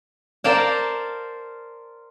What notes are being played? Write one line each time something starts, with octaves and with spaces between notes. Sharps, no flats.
A#4 C5 D5 F5 G5 A5